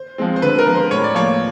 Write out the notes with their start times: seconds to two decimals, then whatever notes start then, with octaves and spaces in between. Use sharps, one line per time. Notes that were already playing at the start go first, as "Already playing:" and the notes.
Already playing: C5
0.18 F3 G#3 C4
0.36 C5
0.42 D3 B4
0.59 A#4
0.67 F3 G#3
0.75 C5
0.91 A2 C#5
1.04 D5
1.15 F3 A#3 C#5